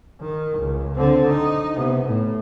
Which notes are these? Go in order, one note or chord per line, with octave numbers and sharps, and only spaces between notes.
D#3
C#2
D3 C4
D#4
C3 B3
A2